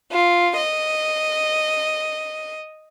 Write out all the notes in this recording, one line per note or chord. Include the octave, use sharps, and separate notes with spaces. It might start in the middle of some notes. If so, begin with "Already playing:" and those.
F4
D#5